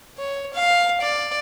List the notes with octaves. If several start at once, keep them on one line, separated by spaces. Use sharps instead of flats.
C#5
F5
D5